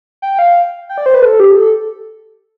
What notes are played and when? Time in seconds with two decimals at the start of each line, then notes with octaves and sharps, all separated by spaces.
0.22 G5
0.39 F5
0.89 G5
0.98 D5
1.06 C5
1.14 B4
1.22 A4
1.40 G4
1.56 A4